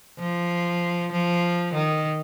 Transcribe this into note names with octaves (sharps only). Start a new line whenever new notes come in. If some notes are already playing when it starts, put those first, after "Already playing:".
F3
F3
D#3